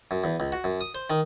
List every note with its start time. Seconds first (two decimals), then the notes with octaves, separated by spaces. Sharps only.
0.11 F#2
0.24 E2
0.40 C#2
0.52 F#4
0.64 F#2
0.81 D#6
0.95 C5
1.10 D#3